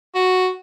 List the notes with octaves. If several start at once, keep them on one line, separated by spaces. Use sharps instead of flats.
F#4